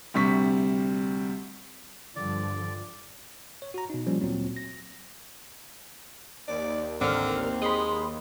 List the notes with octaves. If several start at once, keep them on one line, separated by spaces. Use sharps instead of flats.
D2 C3 G3 C#6 B6
G2 D3 F3 D5
C#5
F#4 A#5
B2 D#4
F3 G3 A#3 C#4
D2 A#2 F#3 C4
A#6
D#2 D5
A1 D3 C4 A#4 F6
G#3 B5 C6 D#6